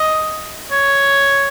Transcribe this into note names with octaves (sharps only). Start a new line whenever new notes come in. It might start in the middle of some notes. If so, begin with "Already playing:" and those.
Already playing: D#5
C#5